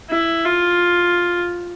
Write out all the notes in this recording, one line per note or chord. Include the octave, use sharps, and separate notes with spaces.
E4
F4